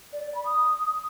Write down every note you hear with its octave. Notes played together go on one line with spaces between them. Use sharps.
D5
D5
B5
D#6